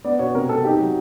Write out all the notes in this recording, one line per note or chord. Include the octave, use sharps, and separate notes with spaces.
B3 D5
B2 C#5
C3 A#4
C3 A4
D#4 G4
F#3